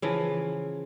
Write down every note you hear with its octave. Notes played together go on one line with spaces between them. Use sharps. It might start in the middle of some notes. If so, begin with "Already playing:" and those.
C#3 E3 F3